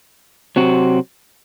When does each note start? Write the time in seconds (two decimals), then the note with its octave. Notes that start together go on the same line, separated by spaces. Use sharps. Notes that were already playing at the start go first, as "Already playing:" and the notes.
0.56 C3 F#3 C4 F#4